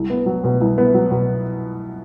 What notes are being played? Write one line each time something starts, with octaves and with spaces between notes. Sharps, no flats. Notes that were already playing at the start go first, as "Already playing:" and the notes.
Already playing: C2
B3
F#3
B2
C2
B3
F#3
B2